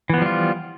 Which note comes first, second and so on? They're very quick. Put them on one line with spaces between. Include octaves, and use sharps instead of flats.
E3 B3 F3 G3 F4